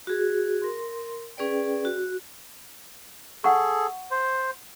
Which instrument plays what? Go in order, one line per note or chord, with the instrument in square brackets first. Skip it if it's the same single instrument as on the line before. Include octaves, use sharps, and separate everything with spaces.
[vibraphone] F#4 G#4
A#4 C6
C#4 G#4 B4 D5 G5
F#4
[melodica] G#4 A4 [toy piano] F#5 C#6
[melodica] C5